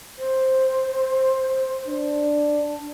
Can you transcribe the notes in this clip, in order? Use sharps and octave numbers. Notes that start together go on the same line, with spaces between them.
C5
D4